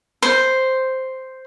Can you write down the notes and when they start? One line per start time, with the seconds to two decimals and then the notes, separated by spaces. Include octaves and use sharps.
0.22 C5